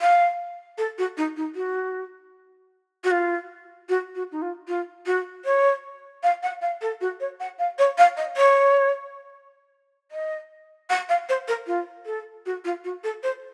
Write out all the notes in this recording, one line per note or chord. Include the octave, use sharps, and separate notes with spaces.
F5
A4
F#4
D#4
D#4
F#4
F#4
F4
F#4
F#4
D#4
F4
F4
F#4
C#5
F5
F#5
F5
A4
F#4
C#5
F#5
F5
C#5
F5
D#5
C#5
D#5
F#5
F5
C5
A#4
F4
A4
F#4
F4
F#4
A4
C5